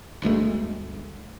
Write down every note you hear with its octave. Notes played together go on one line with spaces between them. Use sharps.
G1 D2 G#3 A3